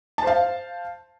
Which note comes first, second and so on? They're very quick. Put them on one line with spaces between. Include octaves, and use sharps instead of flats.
A5 C5 F5